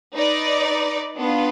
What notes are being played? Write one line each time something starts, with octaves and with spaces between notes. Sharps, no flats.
D#4 B4 D5
B3 D4 F4